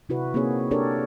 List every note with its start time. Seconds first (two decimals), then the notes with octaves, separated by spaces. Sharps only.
0.09 C3 E4 F#4 B4
0.34 A#3 C4 D#4 G#4 C#5
0.71 D4 G4 A4 A#4 C#5 D5